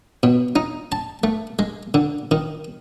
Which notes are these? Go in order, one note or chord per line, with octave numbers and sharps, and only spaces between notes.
B2
D#4
A5
A3
G#3
D3
D#3